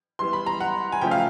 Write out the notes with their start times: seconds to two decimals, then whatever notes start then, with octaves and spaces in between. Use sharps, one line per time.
0.19 E3 G3 B3 C6
0.33 B5
0.46 A#5
0.60 F#5
0.92 G#5
1.01 C#3 F3 A3 G5
1.11 F5